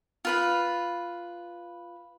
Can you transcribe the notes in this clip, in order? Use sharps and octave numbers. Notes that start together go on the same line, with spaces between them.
F4 B4 B5